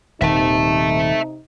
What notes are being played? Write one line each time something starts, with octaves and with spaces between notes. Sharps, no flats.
D#1 C3 D#3 D#4 E5 A5